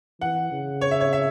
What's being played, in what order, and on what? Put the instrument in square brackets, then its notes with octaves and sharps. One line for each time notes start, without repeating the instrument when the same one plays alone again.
[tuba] E3 [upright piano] F#5
[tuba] C#3
[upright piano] C#5
E5
C#5
E5